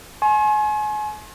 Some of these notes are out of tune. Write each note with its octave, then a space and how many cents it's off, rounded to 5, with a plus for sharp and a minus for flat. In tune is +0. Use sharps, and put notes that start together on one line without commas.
G#5 +30 C6 +45